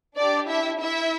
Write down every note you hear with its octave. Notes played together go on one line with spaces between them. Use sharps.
D4 G4 D5
E4 E5
E4 E5